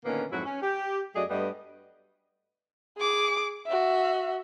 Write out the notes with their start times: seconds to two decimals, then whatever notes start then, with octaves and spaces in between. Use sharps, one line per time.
0.05 A#2 D3 D#3 A#3 B3 C#4
0.31 F2 G#2 F#3 E4 F#4
0.45 C#4
0.62 G4
1.15 F#2 F#3 A3 G#4 D5 D#5
1.29 G2 G3 A3 B3 D5 D#5
2.98 G#4 D6
3.67 F#4 E5